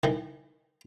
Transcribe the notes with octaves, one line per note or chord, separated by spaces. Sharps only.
D#3 E3